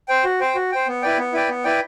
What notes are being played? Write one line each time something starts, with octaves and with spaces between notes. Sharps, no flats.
C5 G5
F#4
C5 G5
F#4
C5 G5
B3
E4 B4 D5 G5
B3
E4 B4 D5 G5
B3
E4 B4 D5 G5